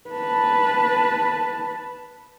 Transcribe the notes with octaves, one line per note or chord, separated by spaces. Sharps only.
B4 A5